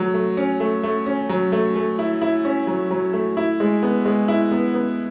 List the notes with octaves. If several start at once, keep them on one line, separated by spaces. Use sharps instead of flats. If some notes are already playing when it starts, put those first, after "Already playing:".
Already playing: F#3 A3
A3
C#4
A3
A3
C#4
F#3
A3
A3
E4
E4
C#4
F#3
F#3
A3
E4
G#3
B3
G#3
E4
B3
B3